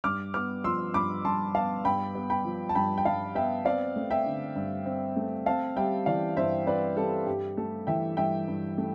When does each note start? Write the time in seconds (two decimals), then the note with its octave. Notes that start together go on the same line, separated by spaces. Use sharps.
0.04 G2 D6 F6
0.34 B3 D6 F6
0.64 F3 C6 E6
0.94 G2 B5 D6
1.25 G2 A5 C6
1.55 B3 F5 A5
1.85 G2 G5 B5
2.15 B3
2.30 G5 B5
2.45 F3
2.69 A5
2.75 G2 G5 B5
2.98 G5
3.05 G2 F5 A5
3.35 B3 E5 G5
3.65 C4 D5 F5
3.96 A3
4.10 E5 G5
4.26 D3
4.55 G2
4.86 C4
5.16 A3
5.46 C4 F5 A5
5.76 G3 E5 G5
6.06 E3 D5 F5
6.37 G2 C5 E5
6.67 C4 B4 D5
6.97 G3 A4
7.27 G2 G4
7.57 A3 A4
7.87 E3 E5 G5
8.17 G2 E5 G5
8.48 G2
8.78 A3